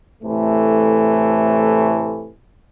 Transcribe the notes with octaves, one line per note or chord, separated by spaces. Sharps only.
A2 C3 E3 A3